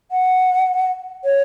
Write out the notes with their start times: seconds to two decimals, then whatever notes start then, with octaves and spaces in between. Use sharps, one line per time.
0.11 F#5
1.25 C#5